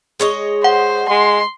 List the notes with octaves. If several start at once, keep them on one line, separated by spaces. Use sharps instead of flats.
G#3 C#5 D#5
C5 F#5
G#3 C6